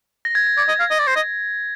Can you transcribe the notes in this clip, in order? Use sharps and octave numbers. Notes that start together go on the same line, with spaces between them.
A#6
G#6
G#6
D5 G#6
D#5
F5
D#5
D5
C5
D#5